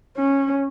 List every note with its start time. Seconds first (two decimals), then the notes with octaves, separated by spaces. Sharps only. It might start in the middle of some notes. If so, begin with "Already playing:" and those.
0.17 C#4